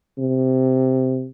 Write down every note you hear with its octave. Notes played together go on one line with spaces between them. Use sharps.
C3